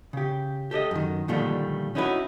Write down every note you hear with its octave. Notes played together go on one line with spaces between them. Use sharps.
C#3 G4
G4 A4 D5 D#5
F#2 D#3
A#2 D3 D#3 F3 G3 A3
C#4 D#4 E4 F#4 A4 B4